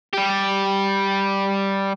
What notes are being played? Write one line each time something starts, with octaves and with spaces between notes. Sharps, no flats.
G3 G4